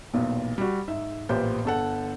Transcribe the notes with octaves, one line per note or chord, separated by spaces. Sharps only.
B1 E2 A#2
G3 F#4
G#2 E5
A1 A#2 B3 G4 C5 G6
G1 A4 F#5